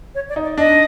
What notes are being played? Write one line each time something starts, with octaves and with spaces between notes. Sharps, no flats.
C#5
D5
D#4
D5
D4 D#5